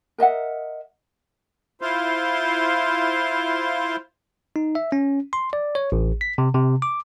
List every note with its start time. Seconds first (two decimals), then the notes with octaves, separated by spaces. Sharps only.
0.18 A#4 D#5 E5 F#5
1.81 E4 F4 C5 F5 C6
4.56 D#4
4.75 E5
4.92 C#4
5.33 C6
5.53 D5
5.75 C#5
5.92 A1
6.21 B6
6.38 C3
6.54 C3
6.82 D6